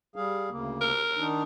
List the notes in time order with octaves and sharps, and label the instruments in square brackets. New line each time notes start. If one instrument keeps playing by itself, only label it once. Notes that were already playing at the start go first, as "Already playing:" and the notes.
[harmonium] G3 G#4 F5
D2 C#3 A#3
[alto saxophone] A#4
[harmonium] D#3 D4 D#4